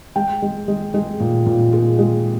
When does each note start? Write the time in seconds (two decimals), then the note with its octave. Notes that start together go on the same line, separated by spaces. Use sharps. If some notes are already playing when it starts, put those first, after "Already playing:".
0.16 G#3 G5
0.42 G#3
0.68 G#3
0.94 G#3 G#4
1.20 A#2
1.46 A#2
1.73 A#2 G#4
1.99 G#3